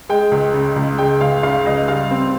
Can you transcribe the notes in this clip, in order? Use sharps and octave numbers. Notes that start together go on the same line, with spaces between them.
G#3 G5
C#2
C#3
C#2
G#3 G5
C#2 F5
C#3 F5
C#2 D#5
G3 F5
C4